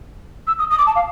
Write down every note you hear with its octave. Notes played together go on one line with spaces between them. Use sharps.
E6
D#6
D#6
D6
A5
F5